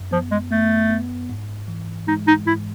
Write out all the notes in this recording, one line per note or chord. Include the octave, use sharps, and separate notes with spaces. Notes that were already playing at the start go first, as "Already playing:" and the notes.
Already playing: F#2
F3 B3
G#3
A3 B3
B3
G#2
E3
G#3 D#4
D#4
G#2 E4